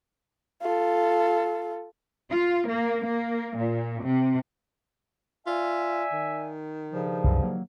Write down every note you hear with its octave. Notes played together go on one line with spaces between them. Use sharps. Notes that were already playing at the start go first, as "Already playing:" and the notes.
F4 A4
F4
A#3
A#3
A#2
C3
F4 D5 E5 G#5
D#3
G2 C#3 F3
C2 F#2 C3
F#3 A#3